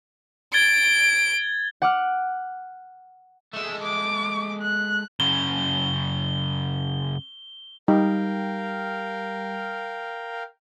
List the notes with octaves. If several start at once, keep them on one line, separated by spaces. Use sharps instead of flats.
G#6 A6 D7 G7
F#5 D6 F6
G#3 A3 E6
D6
F#6
F#2 C#3 G7
G3 D#4 A#4 F5 G5